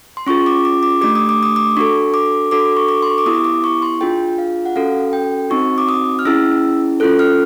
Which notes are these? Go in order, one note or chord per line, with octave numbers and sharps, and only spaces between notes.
C6
C#4 F4 G#4 C#6
D6
D6
D6
A3 D4 G4 D6
D#6
D6
D#6
D6
D4 F#4 A4 C#6
D6
D4 F#4 A4 D6
C#6
D6
C6
C#6
D6
B3 E4 G4 D#6
D6
C#6
C6
D4 F4 G#4 G5
F5
F#5
C#4 F#4 A4 F5
G5
C4 D#4 F#4 C#6
D6
D#6
F6
C#4 E4 G#4 E6
C#4 F4 A4 F#6
F6